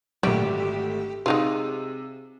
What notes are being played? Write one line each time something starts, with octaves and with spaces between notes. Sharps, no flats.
G#1 A#2 D3 F#3 G3 A3 G4
C3 G#3 D#4 F4 G#4